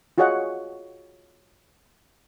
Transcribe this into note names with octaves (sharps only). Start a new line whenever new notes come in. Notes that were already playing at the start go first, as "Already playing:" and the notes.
F4 F#4 G#4 C#5 D#5 F#5